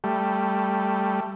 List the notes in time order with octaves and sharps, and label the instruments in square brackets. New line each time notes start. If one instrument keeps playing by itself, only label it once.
[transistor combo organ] G3 A3